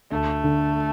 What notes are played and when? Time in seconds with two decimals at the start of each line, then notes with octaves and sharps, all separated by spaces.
0.11 D2 A3
0.44 D3